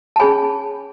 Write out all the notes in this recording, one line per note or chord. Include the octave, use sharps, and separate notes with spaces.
A5
C#4 G#4 C#5 G#5 B5